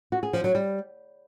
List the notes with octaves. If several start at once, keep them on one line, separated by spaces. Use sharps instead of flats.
F#4
G#4
F3
F#3
G3